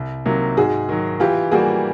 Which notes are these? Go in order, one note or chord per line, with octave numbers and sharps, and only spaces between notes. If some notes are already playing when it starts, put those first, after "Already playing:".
Already playing: C2
C3 D#3 F#3 A#3
G#2 F#4 G#4
D#3 F#3
E3 F4 G4
G3 A#3 F#4 G#4